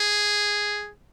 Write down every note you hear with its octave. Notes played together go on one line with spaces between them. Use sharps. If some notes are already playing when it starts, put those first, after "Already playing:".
Already playing: G#4